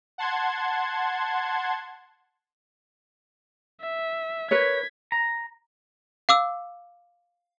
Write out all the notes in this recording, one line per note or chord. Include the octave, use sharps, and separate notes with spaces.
F#5 A5 C6 G#6
E5
A#4 B4 C#5 G#6 B6
A#5
F5 D6 E6